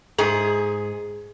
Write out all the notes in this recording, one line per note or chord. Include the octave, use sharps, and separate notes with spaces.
G#2 G#4